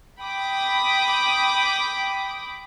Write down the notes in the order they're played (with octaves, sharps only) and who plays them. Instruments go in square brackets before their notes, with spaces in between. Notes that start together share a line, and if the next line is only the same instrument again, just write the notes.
[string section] G5 B5 D6 D#6